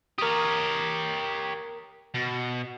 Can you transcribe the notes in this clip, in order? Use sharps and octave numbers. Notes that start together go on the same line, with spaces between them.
G4 A#4 C#5 D#6
B2